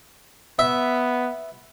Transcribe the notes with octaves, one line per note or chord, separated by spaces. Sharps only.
B3 E5